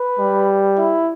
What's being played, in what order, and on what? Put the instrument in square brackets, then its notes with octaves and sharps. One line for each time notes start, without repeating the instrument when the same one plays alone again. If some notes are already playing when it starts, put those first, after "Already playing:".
Already playing: [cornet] B4
[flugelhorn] G3
[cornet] E4